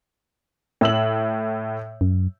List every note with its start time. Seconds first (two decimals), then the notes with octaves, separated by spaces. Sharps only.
0.81 A2 E6 F#7
2.01 F#2